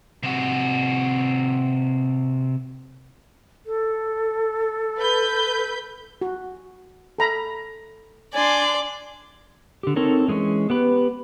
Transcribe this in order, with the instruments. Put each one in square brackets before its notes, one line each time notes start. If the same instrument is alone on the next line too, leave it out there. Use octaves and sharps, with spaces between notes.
[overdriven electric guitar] C3 F#4
[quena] A4
[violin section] B4 B5 G6
[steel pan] F#4
A4 A#5 B5
[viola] D4 C6 [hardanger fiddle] D5 [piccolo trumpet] G#5
[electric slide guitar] D3 G4
C4 D#4 A4 A#4 C#5
E3 G#3 A#3 C#4
B3 G4 B4